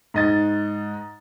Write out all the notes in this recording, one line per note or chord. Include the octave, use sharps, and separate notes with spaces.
G#2 D#5 A6